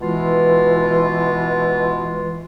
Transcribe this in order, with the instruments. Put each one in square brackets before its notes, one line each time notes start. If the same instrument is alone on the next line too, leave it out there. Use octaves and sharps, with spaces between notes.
[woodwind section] B2 G#3 F4 [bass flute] E3